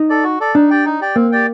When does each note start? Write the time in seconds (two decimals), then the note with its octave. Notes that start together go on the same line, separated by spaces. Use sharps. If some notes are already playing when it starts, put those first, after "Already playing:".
Already playing: D#4
0.09 A4 D5
0.24 F#4
0.40 A4 D5
0.55 D4 D#4
0.71 G4 D5 G5
0.85 D#4
1.01 G4 D5 G5
1.15 A#3 C4
1.32 G4 D5 G5